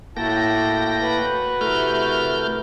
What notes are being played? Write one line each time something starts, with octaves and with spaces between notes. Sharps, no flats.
A2 A#3 E4 F#4 G5 A5 A#6
F#4 B4
C3 A3 E4 A#4 F6 G6